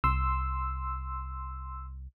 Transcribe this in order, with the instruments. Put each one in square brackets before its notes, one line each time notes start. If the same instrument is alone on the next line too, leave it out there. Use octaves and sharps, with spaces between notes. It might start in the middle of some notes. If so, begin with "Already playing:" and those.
[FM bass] C2 [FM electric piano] C6 E6